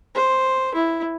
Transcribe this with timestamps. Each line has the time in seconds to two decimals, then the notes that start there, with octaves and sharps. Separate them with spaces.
0.15 C5
0.74 E4